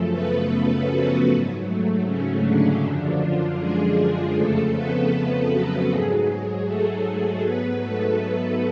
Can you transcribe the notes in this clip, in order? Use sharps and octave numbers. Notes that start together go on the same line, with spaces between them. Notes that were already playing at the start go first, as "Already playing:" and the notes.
Already playing: F#2 C#3 F3 A3 A4
B3 B4
F#3 F#4
G#2 F#3
A3
C#3 C#4
D3 D4
F#2 D3 F3 D4
F3 F4
G#3 G#4
F2 C#3 F3 A3 A4
B3 B4
A3 A4
F#3 F#4
G#2 F#3 G#3 G#4
G#3 G#4
A3 A4
G#2 F#3 B3 B4
A3 A4